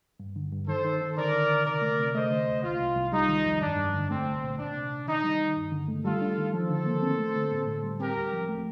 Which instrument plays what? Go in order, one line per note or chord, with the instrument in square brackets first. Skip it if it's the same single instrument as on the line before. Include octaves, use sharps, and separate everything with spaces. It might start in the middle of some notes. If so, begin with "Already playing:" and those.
[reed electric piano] G2
D3
G2
[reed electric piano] D#3 [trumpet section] A4 C5
[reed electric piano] D#3
D#3
[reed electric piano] D3 [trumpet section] A#4 D5
[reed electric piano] D3
D3
[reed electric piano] C3 [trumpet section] A#4 D5
[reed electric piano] A3
C3
[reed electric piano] A3 [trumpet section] C5 D#5
[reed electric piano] D3
D2
[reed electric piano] C2 [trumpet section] F4
[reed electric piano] C2
C2
[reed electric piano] G3 [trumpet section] D#4
[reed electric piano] D#3
F2
[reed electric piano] G2 [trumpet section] D4
[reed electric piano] G2
D3
[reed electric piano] A3 [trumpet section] C4
[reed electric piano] C2
A#2
[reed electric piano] D2 [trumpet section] D4
[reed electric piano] C3
D2
[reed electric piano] D#3 [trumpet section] D#4
[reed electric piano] G3
D#3
G2
D3
A3
[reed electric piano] G3 [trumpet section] F4 A4
[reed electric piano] D4
D#3
[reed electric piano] F3 [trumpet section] A4 C5
[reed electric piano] D3
A#3
C4
A3
D3
A2
A2
G3
[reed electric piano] C4 [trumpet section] G4 A#4
[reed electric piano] D2
F3
A3